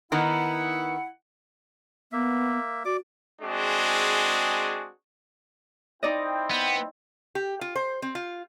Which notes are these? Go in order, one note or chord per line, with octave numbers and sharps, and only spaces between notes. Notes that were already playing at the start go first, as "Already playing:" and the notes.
D#3 B3 D#4 E4 F#5
A#3 B3 E5
F#4 D5 D6
G#3 C4 D4 F#4 G#4
C4 D#4 E4 D5 D#5 G5
B3
G4
F4
C5
C4
F4